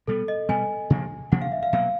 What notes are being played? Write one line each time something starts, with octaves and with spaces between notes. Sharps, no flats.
B2 G3 B3 A4
D#5
B2 G3 B3 G#5
C3 F3 A#3 D4
C3 F3 A#3 D4 F#5
F5
E5
F5
B2 F#3 A#3 F5